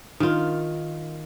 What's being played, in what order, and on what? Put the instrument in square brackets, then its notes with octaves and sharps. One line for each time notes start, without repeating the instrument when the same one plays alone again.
[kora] D#3 F4